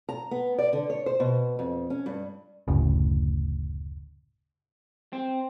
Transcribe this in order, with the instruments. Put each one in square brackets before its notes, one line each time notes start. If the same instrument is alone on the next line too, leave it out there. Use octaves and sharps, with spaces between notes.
[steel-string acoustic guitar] A#5
B3
D5
D3
C#5
C5
B2
F2
C#4
G2
[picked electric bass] F#1 D2 A2 C#3
[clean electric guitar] C4